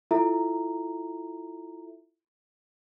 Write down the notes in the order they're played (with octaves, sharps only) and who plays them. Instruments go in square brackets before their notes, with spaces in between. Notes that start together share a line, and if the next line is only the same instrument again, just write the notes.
[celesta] E4 F4 A4 E5 A#5